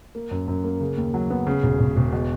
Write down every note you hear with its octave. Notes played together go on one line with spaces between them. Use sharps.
A#3
F#2
F#2
A#3
C#3
D#2
F#3
B3
C#3
E1
E1
E1
B2